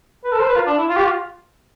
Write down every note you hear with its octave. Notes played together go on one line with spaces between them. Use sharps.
B4
A4
C5
B4
F4
D4
E4
F4
G4
F4